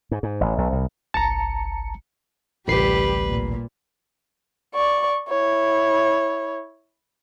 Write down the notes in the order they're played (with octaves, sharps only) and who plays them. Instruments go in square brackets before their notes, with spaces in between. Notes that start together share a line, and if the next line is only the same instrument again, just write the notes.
[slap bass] G#2
G#2
A1
B1
C2
[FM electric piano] G1 C2 C#7 [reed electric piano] A5 A#5
[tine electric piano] A1 C7 [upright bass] D2 C3 [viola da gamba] G3 G4 [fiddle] B4
[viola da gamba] A#2
[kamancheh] D5 C#6
E4 C#5